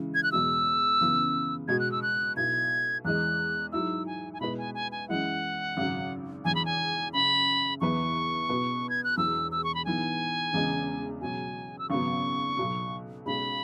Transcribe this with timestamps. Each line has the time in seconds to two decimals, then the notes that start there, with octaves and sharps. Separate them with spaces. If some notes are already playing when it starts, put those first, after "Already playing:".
Already playing: C#3 E3 G#3 E4
0.14 G#6
0.23 F#6
0.32 E2 B2 G#3 B3 F#4 E6
1.00 F#2 C#3 E3 B3
1.68 B2 G#3 B3 F#4 G#6
1.79 F#6
1.92 E6
2.02 F#6
2.36 B1 B2 B3 E4 G#6
3.05 E2 E3 G#3 F#6
3.72 G#2 F#3 E4 E6
4.06 G#5
4.33 G#5
4.41 B2 G#3 E4 B4 B5
4.58 G#5
4.74 G#5
4.92 G#5
5.08 F#2 E3 G#3 E4 F#5
5.77 G#1 F#2 C#3 F#3
6.44 E1 E2 E3 G#5
6.55 B5
6.65 G#5
7.13 F#1 F#2 C#3 B5
7.80 E2 E3 B3 E4 B4 C#6
8.49 B2 B3 F#4 B4
8.89 G#6
9.04 F#6
9.17 E1 E2 E3 E6
9.51 E6
9.64 C#6
9.75 B5
9.85 G#2 E3 B3 G#5
10.53 E1 E2 C#3 G#3 B3
11.21 C#2 B2 F#3 C#4 F#4 G#5
11.79 E6
11.90 G#1 F#2 C#3 F#3 B3 C#6
12.57 B1 B2 F#3
13.25 B1 B2 G#3 C#4 G#4 B5